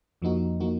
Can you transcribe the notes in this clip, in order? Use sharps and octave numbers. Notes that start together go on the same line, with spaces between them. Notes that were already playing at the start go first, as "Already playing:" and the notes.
F2 F3 A#3 D#4 F#4
F3 A#3 D#4 F#4